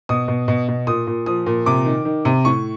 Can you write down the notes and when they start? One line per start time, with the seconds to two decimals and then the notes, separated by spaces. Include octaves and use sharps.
0.09 B2 D#6
0.28 B2
0.48 B2
0.68 B2
0.87 A#2 D#6
1.07 A#2
1.26 F3 D#6
1.46 A#2
1.66 C3 D6
1.85 D#3
2.05 D#3
2.25 C3
2.45 A2 C#6